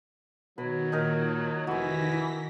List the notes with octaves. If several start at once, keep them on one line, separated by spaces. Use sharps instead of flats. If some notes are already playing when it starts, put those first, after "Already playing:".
B2 D#3 F#3 B4
A#2 D#4 A#4
F1 D#3 E3 F#4 G#5 A#6 B6
E4